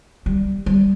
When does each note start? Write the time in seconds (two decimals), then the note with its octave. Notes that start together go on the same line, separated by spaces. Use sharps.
0.26 G3
0.66 G3